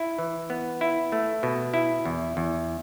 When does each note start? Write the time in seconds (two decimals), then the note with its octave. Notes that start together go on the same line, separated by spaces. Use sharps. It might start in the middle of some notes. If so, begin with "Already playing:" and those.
Already playing: E4
0.18 E3
0.50 B3
0.81 E4
1.12 A3
1.43 B2
1.74 E4
2.05 E2
2.37 E2